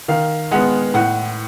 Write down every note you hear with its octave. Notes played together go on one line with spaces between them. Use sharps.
D#3 F5
G#3 B3 F#5
A2 F#5